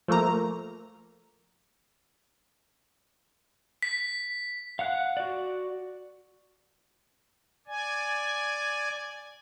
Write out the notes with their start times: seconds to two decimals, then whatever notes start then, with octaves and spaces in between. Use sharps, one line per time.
0.08 F3 A3 A#3 A#5
3.83 B6
4.79 F5 F#5 F#6
5.17 F#4 D5
7.67 D5 G#5